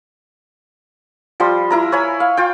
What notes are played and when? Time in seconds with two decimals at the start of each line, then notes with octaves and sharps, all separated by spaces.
1.40 F3 G3 C6
1.70 E4 A#4 A#5
1.92 C#5 G#5 B5
2.20 F5
2.37 F4 G5